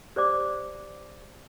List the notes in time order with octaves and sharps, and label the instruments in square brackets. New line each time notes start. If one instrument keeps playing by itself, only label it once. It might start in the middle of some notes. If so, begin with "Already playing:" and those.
[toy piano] G4 C5 D5 D6